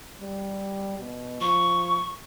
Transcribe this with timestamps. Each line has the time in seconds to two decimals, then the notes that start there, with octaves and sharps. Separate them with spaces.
0.21 G3
0.99 B2
1.41 F3 C#6